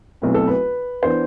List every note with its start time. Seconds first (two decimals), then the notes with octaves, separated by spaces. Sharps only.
0.22 B1 B2 A3 C4 E4 B4
0.34 A4
0.47 B4
1.02 E3 B3 D4 C5